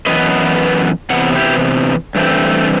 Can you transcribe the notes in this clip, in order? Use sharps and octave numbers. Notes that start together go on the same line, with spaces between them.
F#2 E3 B3 B4 D#5
C3 E3 B3 F#5
E4 G4
G2 E3 A3 C4